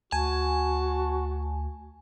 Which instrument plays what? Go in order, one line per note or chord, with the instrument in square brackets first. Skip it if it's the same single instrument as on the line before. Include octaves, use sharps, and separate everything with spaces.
[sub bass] D2 [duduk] F#4 [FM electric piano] G#5 [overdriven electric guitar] A5